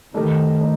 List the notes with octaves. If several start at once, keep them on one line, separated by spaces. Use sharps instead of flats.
D#3 A3 D#4 G4 A#4
A3 D#4 A#4